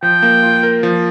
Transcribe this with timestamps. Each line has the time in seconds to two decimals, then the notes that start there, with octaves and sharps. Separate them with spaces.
0.02 F3 G5
0.22 A#3
0.43 F4
0.63 A#4
0.83 F3